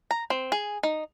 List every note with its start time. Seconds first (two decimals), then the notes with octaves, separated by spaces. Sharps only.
0.11 A#5
0.30 C4
0.52 G#4
0.83 D#4